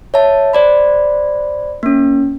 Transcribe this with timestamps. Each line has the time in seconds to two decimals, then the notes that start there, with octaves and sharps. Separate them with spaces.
0.14 C#5 E5 A5
0.53 C5 D5 B5
1.83 A#3 C#4